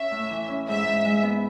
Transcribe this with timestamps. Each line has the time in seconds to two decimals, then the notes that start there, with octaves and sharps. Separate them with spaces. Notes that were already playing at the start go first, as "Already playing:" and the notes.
Already playing: C#4 E5
0.11 A2
0.30 E3
0.48 C#4
0.68 G#2 E5
0.86 G#2
1.05 G#3
1.23 B3